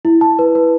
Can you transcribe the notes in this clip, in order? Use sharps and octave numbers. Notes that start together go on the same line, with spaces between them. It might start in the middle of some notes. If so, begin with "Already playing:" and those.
E4
A5
B4
B4